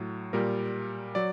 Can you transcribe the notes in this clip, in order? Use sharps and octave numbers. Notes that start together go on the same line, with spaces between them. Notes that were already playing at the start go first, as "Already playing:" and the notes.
Already playing: A2 F#3
A#2 G3 A#4
F#3 D5